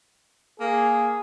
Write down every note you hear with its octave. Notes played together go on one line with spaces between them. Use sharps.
A#3 G#4